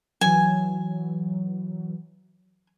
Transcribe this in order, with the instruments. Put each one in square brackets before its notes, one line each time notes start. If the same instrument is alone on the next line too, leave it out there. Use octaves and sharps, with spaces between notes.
[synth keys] E3 F#3 [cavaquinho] G#5